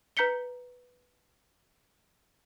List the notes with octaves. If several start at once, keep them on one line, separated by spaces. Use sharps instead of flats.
B4 A#5 G6 B6 C#7 G7